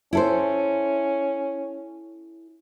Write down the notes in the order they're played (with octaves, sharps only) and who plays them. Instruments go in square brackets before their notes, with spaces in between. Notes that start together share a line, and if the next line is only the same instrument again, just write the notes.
[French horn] C#4 [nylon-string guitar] E4 A4 C5